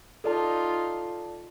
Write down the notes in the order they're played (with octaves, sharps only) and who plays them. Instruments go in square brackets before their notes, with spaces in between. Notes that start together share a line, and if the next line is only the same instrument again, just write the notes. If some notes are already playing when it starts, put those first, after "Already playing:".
[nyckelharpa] D#4 F4 [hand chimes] A4 D5 A5